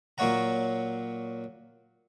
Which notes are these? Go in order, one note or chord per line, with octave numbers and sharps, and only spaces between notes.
A#2 F#3 A#3 C#5 F#5 A#5